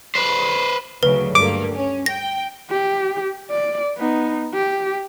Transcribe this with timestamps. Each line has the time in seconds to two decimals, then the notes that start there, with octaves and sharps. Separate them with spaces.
0.15 B4 C5
1.03 D2 C#3 F#3 B4
1.35 G2 A3 A#3 D6
1.74 C#4
2.06 G5 A#6
2.70 G4
3.50 D5
3.97 B3 D#4
4.54 G4